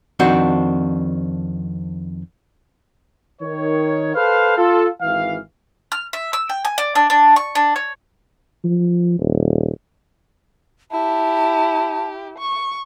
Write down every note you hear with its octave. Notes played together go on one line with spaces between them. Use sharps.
F2 D#3 C4 D4 F#4
D#3 C#5
A4 B4 C5 F5
F4 A4
G#1 E3 F5
F6
E5
E6
G5
G#5
D5
D4
D4
C#6
D4
C#5
F3
D#1
E4 G4 A5
C#6